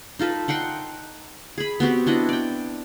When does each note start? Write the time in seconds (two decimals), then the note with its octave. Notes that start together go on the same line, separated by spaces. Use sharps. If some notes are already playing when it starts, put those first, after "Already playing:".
0.19 D#4 F4 A4 B4
0.48 D#4 F#5 G5 C6
1.58 G#4 B5
1.80 B3 C4 F#4 G4
2.07 D4 E4 D#5 F#5
2.29 D5 G5